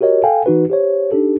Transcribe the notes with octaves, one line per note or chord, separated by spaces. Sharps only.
F#4 G4 A#4 C#5 D#5
A4 F5 G5 G#5
E3 D#4 F#4 B4
G4 C5 C#5
D4 D#4 G4 A4